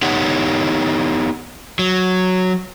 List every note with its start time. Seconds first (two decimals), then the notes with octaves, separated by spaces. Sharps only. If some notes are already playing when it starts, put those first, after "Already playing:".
0.02 B3 D#4 G4 C#5 F#5
1.79 F#3